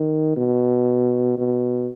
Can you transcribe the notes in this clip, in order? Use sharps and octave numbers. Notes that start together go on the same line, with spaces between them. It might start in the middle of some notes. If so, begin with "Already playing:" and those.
Already playing: D#3
B2
B2